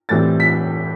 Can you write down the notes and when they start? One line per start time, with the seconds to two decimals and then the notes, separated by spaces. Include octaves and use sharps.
0.09 A2 E3 G3 C4 A6
0.40 B6